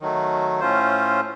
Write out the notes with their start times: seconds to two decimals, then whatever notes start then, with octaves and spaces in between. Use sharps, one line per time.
0.01 D#3 F#3 A3
0.60 A2 A3 C#4 F4 C5